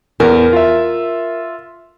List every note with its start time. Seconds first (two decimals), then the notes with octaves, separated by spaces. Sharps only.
0.20 E2 A#4
0.53 F4 E5